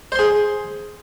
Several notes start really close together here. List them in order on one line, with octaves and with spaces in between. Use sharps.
C5 C6 G#4